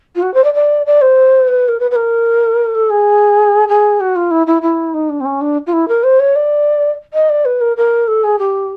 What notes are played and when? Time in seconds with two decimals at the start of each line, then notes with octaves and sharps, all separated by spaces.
0.16 F4
0.23 F#4
0.34 C5
0.44 D5
0.54 D5
0.86 D5
1.02 C5
1.48 B4
1.68 A#4
1.80 B4
1.91 B4
1.96 A#4
2.75 A4
2.90 G#4
3.69 G#4
4.00 F#4
4.16 F4
4.31 E4
4.47 E4
4.62 E4
4.94 D#4
5.10 D4
5.21 C4
5.25 C#4
5.41 D4
5.67 F4
5.73 E4
5.88 A#4
6.04 C5
6.20 C#5
6.36 D5
7.14 D#5
7.29 D5
7.45 B4
7.61 A#4
7.77 A#4
8.08 A4
8.24 G#4
8.39 G4